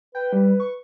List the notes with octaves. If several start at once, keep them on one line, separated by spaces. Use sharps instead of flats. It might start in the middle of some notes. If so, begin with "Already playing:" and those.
B4 G5
G3
C#6